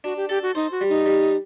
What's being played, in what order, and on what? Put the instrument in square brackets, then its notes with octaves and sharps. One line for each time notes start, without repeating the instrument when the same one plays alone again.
[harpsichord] D4 [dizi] F#4
[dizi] G4
[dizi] G4 [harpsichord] A4
[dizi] F#4
[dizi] D#4 [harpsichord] C5
[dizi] F#4
[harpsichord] G3
[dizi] D#4
[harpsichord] G3